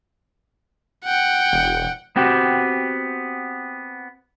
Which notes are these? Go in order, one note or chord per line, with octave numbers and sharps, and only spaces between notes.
F#5 G5
E1
B3 C4 F#4 G4